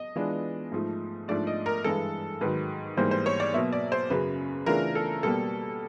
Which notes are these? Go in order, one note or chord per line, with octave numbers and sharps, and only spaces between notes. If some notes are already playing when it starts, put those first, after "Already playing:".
Already playing: D#5
E3 G#3 B3 D4 F4
G#2 F3 A3
G#2 F3 A3 D4 D5
D#5
A#4
G2 E3 G#3 A4
G#2 D#3 F#3 B4
G#2 E3 G3 A#3 C5
C5
C#5
D5
B2 F#3 A#3 E5
D5
C5
F#2 C#3 F#3 B4
C#3 E3 A3 D4 F4 A#4
A4
B2 G3 A#3 A4